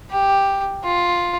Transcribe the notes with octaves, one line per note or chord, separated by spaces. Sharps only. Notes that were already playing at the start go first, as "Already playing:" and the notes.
G4
F4